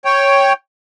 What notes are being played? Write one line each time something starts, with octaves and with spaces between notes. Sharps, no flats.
C#5 G5